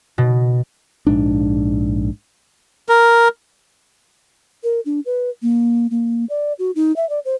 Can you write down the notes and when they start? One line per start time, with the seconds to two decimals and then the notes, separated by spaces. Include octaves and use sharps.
0.18 B2
1.07 A#1 G#2 D4
2.89 A#4
4.64 A#4
4.86 D4
5.06 B4
5.42 A#3
5.91 A#3
6.30 D5
6.59 F#4
6.76 D#4
6.96 E5
7.10 D5
7.25 C5